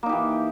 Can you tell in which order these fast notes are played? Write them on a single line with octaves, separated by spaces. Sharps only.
A#3 D#4 G4 E3